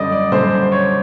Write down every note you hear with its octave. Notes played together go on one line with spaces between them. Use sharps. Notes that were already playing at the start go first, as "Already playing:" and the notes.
Already playing: F#2 D3 G3 D5 D#5
D5
F#2 D3 G3 C5
C5
C#5